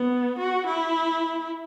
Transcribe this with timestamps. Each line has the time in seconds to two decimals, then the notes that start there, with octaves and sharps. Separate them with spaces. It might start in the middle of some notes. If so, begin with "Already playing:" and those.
Already playing: B3
0.39 F#4
0.67 E4